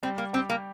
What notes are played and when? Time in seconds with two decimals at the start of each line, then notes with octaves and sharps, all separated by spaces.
0.03 G3 C4
0.18 A#3
0.33 C4 G4
0.50 A#3